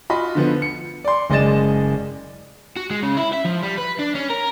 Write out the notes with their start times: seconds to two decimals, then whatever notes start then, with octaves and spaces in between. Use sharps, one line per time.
0.10 F4 F#4 D#5 B5
0.35 D3 F3 B3
0.62 C#7
1.05 D5 C6
1.30 F#1 G#3 D5 D#5 A6 E7
2.77 F#4
2.91 G#3
3.03 C#3
3.18 E4
3.34 E5
3.45 F3
3.63 G3
3.78 B4
3.99 D4
4.15 C#4
4.30 A#4